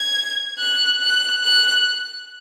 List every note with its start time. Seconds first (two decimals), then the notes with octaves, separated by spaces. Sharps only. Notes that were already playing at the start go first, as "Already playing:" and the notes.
Already playing: G#6
0.59 F#6
1.01 F#6
1.44 F#6